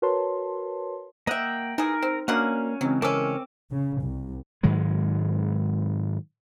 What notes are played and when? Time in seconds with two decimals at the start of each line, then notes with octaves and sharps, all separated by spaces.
0.02 F#4 A#4 B4 C#5 A5 C6
1.27 A#3 D#5 E5 F#5 G5
1.78 E3 D#4 G#4 A#4
2.03 C4
2.28 B2 A#3 C#4 D4 F#4 A#4 F5 F#5
2.81 C#3 E3 F#3 G#3 C4
3.02 A3 C4 C#4 A#4 D6 E6
3.71 C#3
4.02 C2
4.63 G#2 D#3 F#3 G#3